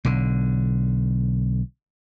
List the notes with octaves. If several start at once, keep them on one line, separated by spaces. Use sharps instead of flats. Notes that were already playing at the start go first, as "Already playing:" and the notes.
B1 D3